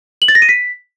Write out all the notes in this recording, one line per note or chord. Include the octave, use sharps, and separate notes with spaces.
F#7
A6
A#6
D#7
B6